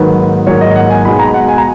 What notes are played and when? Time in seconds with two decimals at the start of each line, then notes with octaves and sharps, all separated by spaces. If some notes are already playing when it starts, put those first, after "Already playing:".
Already playing: G#2 D#3 F#3 A#3 B4
0.46 G#2 D#3 F#3 A#3 C#5
0.61 D#5
0.76 F#5
0.90 G#5
1.05 B2 G#3 B3 B5
1.19 A#5
1.34 F#5
1.48 G#5
1.58 A#5